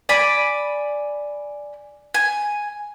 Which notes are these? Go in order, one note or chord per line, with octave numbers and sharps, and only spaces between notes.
D5 G#5 B5
G#5